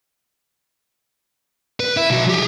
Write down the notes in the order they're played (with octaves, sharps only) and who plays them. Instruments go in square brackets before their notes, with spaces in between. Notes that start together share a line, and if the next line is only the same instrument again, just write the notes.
[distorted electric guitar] B4
E4 E5
B1 F#4
G4 G#4